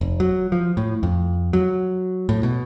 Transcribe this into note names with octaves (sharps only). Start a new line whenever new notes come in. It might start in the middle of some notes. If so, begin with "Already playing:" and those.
F1
F#3
F3
A2
F2
F#3
A2
B2